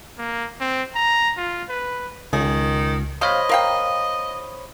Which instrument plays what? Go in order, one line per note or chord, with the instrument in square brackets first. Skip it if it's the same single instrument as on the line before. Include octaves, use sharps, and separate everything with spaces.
[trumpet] A#3
C4
A#5
F4
B4
[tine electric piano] C#2 [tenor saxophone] D#3 [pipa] G#4
[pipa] C3 F5 [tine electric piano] C5 C#5 B5 [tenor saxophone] D#5
[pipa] A#4 F5 G5